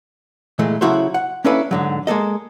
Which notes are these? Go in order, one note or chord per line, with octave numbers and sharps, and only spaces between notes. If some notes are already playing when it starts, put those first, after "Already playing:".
A#2 E3 G#3 A3
C#3 F#3 E4 F#4 A4 C5
F#5
A#3 C#4 D4 E4 A4 B4
G#2 D3 F#3
G#3 A#3 A4 D#5